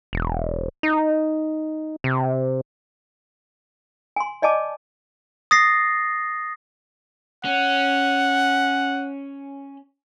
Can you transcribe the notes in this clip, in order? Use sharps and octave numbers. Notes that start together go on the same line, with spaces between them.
E1
D#4
C3
G#5 C6
D5 D#5 G#5 A5 D6
D#6 A6 A#6 C7
C#4 F#5